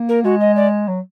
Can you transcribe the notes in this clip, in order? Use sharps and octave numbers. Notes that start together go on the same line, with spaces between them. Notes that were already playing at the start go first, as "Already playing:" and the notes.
Already playing: A#3
A#4
G#3 F#4
D#5
D5
F#3